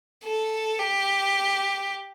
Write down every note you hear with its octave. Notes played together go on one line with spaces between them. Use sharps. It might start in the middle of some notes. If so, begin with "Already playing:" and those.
A4
G4